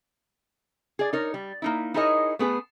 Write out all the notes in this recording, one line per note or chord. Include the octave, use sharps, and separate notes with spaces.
G#4 D5
D#4 A#4 C#5
G3
A#3 D#4 E4
D#4 E4 G#4 A#4 C#5 D#5
A3 B3 G#4 B4